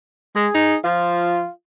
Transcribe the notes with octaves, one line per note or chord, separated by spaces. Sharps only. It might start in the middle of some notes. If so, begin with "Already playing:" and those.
G#3 G#4
D#4
F3 F4